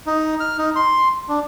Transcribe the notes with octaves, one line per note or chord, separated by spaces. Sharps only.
D#4
F6
D#4
C6
D4